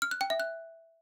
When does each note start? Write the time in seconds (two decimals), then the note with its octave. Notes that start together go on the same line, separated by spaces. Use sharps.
0.02 F6
0.11 F#6
0.21 G5
0.30 E5
0.40 F#6